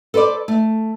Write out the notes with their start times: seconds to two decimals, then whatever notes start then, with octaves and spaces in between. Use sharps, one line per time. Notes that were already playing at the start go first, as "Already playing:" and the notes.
0.14 A4 B4 C5 D5
0.48 A3